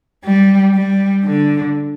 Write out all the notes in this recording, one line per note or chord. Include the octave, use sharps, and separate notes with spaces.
G3
G3
D3